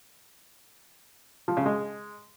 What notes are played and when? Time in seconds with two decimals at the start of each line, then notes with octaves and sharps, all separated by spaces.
1.48 F3
1.57 C#3
1.66 G#3